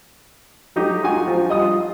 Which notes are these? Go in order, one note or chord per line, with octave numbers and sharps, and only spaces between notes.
F#3 D#4 G4 A4
D#4 F4 F#4 G#5
F3
G3 D#5 D#6
F4